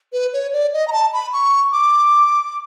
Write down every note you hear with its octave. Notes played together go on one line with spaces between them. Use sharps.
B4
C#5
D5
D#5
A#5
A5
B5
C#6
D6